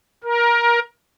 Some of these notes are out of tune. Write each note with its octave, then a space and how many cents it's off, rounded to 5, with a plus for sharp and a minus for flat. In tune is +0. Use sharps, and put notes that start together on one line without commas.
A#4 +20